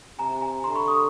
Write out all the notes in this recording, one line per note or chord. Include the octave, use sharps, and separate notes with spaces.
C3 G#5 A#5
G#5 A#5
D3 A#5 C6
B5 C#6
C#6 D#6